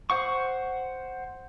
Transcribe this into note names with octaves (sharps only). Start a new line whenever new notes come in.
C5 F#5 C#6